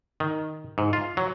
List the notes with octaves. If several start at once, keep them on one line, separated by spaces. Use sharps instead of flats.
D#3
G#2
F4
F#3